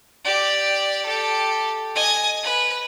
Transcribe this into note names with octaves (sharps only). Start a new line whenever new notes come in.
G4 D5
G4 A4
D#5 G#5
B4